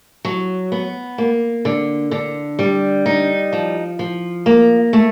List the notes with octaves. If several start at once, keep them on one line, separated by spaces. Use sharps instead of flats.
F#3
B3
A#3
D3
D3
G3
D#4
F3
F3
A#3
A3